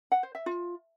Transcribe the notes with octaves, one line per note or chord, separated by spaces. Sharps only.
F#5
C5
E5
F4